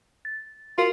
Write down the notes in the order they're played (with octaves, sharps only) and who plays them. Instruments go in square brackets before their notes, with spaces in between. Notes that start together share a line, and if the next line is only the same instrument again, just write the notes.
[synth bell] A6
[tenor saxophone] F4 [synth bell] F#4 A#4